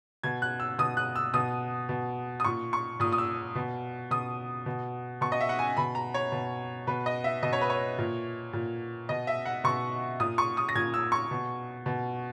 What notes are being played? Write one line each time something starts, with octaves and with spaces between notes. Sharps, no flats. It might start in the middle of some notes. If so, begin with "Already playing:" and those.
B2 G#6
F#6
E6
B2 D#6
F#6
E6
B2 D#6
B2
D#6
A#2 C#6
C#6
A#2 D#6
D#6
E6
B2
B2 D#6
B2
B2 C#6
D#5
E5
F#5
G#5
B2 B5
A#5
C#5
B2
B2 B4
D#5
E5
B2 D#5
C#5
B4
C#5
A#2
A#2
B2 D#5
E5
F#5
B2 C#6
A#2 D#6
C#6
D#6
A#6
A#2 G#6
E6
C#6
B2
B2